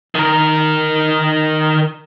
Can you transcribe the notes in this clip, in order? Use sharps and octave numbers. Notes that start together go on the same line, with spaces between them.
D#3 A#4